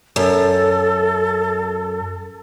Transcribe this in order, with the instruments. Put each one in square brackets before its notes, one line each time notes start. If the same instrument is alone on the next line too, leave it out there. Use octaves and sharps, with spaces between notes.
[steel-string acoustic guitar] F#2 [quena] A4